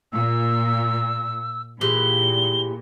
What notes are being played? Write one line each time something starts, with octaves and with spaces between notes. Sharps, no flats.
A#2 E6
A#2 E3 G#3 G4 G7